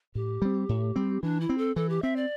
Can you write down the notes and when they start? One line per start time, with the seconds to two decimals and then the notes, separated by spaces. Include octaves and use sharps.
0.15 A2 G4
0.42 G3 C4
0.69 A2
0.96 G3 C4
1.22 E3 D4
1.41 E4
1.49 C4
1.58 A4
1.76 E3 A4
1.89 G4
2.03 C4 E5
2.16 D5